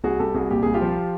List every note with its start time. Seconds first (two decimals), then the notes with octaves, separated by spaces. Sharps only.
0.04 C2 F#4 G#4
0.20 C2 G4 A4
0.35 C2 F#4 G#4
0.50 A#2 G4
0.63 C2 G#4
0.74 F4 G4
0.81 F3